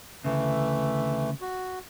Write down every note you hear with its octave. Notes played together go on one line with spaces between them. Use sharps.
D2 A#2 C#3 E3 A3
F#4